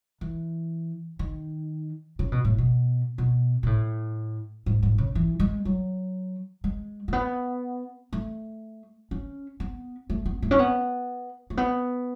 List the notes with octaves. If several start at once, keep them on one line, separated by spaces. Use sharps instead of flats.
E3
D#3
C#3
B2
A2
B2
B2
B2
A2
G#2
G#2
C#3
E3
G#3
F#3
G#3
A3
B3
A3
C#4
B3
A3
B3
A3
C#4
B3
A3
B3